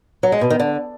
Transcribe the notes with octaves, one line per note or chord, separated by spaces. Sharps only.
F#3
G#3
B2
D#3
D3